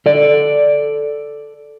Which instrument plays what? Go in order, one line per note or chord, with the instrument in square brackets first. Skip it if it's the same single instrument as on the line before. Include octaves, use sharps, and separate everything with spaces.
[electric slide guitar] A4 D5